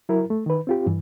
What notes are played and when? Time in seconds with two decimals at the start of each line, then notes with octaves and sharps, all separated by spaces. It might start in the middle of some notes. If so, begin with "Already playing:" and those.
0.09 F#3 E4 A#4
0.30 A3
0.46 D#3 B4
0.67 C4 F4 G4
0.86 G2 E3